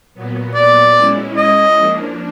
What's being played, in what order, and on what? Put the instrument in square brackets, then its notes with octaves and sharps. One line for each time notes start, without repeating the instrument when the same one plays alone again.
[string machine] A#2 F#3 B3
[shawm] D5
[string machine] G#3 C#4 E4
[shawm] D#5
[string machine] F3 A#3 D4